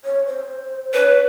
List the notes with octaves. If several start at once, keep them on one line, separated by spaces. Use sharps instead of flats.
C#5
C5
B4 C#5